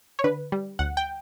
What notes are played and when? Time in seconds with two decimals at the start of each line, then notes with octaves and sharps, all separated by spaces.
0.19 C#5
0.24 D3 B4
0.52 G3
0.79 D2 F#5
0.97 G5